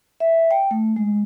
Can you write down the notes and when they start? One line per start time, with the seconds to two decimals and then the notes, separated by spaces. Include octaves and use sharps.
0.20 E5
0.51 G5
0.71 A3
0.96 G#3